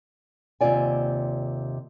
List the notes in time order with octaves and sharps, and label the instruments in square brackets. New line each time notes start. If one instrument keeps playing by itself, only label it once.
[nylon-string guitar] D#2 C3 A#3 F4 D5 G#5